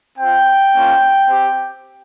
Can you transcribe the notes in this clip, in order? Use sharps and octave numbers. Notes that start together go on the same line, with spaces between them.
C4 F4 G5
A#3 C#4 F4
C4 G4